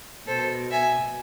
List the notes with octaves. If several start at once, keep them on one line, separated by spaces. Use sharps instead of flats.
B2 A4 C5
E5 G#5